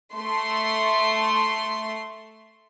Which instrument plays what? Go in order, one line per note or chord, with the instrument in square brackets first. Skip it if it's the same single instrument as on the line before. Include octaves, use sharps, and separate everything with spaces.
[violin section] A3 C6